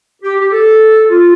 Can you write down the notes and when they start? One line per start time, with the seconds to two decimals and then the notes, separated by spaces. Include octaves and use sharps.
0.22 G4
0.39 G4
0.51 A4
1.10 F4